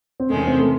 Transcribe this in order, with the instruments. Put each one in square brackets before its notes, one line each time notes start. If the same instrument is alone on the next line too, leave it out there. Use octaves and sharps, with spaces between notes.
[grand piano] C4
[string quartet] E2 C3 D#3 G#3 C#4 [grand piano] A3
[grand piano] C4
A3